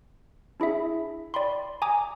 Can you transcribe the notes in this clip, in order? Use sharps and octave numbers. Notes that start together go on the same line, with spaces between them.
D4 E4 G#4 E5
D5 G5 B5 C6
G#5 A#5 D6 D#6